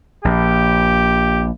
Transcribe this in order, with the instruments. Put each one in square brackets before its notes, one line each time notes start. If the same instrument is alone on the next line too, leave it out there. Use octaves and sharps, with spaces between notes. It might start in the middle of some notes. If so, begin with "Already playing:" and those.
[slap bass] A#1 [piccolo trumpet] G4